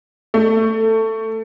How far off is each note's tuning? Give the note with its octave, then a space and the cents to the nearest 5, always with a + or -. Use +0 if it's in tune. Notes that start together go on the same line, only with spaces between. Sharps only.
A3 +15